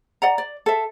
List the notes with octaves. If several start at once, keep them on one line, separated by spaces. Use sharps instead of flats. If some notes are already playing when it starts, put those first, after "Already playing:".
D5 F#5 A#5
D5
A4 E5